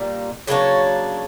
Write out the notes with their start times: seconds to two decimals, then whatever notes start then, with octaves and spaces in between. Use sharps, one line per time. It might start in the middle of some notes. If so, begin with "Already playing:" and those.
Already playing: A#2 G3 A#3
0.47 C#3 F#3 A#3 D4 C#5